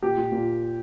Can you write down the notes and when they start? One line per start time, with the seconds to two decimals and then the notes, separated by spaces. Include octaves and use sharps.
0.02 A#2 G4
0.17 A#2
0.32 A#2